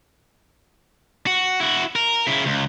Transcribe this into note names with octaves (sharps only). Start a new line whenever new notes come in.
F#4
E4 F#4
A#4
C#3 E4
C#2